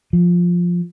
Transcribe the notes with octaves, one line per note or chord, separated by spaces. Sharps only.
F3